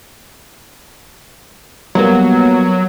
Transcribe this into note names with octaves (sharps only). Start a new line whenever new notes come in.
F#3 G3 A#3 B3